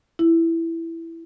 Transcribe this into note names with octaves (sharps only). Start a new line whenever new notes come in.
E4